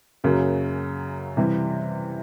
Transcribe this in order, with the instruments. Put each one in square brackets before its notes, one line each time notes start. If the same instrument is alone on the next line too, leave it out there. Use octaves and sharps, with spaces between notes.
[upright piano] F#2 C#3 F#3 A#3
C3 E3 G3